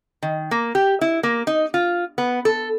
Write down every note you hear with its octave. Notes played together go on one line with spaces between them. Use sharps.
D#3
A#3
G4
E4
A#3
D#4
F4
B3
A4